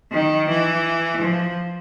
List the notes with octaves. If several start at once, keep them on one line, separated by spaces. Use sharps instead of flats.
D#3
E3
F3